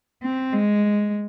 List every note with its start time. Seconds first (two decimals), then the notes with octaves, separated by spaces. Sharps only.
0.24 C4
0.53 G#3